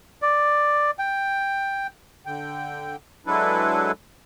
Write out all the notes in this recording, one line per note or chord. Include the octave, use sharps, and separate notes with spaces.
D5
G5
D3 G5
F#3 G#3 D4 E4 A4 B4